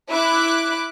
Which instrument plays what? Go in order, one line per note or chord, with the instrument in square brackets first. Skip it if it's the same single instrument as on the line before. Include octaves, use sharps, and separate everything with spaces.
[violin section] E4 D6 F#6